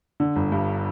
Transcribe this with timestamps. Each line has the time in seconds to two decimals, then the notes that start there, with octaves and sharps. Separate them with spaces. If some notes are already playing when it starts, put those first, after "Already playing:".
0.20 D3
0.36 G1
0.52 G2